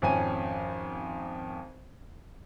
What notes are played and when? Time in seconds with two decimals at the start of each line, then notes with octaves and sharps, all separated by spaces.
0.02 G#1 F2 C#4 G#5 D#7